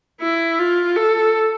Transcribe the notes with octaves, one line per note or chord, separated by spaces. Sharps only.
E4
F4
A4